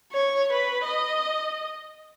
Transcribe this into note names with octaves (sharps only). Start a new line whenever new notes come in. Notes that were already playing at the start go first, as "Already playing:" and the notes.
C#5
B4
D#5